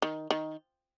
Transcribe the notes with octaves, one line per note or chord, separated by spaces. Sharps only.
D#3
D#3